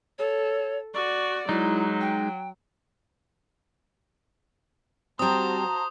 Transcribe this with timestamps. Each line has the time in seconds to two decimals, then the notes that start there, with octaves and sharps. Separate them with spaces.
0.19 A4 C#5
0.94 F#4 D5 C#6
1.49 F#3 G#3 D#4 E4
2.01 G5
5.19 G3 C4 F#4 C5 A5 A#5 D#6